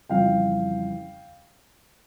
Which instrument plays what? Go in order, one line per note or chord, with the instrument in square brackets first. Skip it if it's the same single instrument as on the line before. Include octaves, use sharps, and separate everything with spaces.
[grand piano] F2 C#3 E3 G3 F5 G5